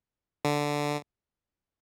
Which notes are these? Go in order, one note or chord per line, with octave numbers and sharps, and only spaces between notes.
D3